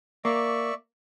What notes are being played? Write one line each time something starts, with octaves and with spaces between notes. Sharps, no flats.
A#3 D5 E5 C#6